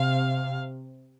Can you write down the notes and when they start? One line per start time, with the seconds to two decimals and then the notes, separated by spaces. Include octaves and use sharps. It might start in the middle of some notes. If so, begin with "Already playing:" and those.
Already playing: C3 F5